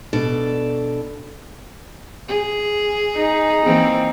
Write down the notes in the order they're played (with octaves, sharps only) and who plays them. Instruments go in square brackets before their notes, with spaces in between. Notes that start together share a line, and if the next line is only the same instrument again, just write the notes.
[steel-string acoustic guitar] B2 D4 A4 D5
[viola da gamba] G#4
[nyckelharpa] D#4
[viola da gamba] E3 A#3 C4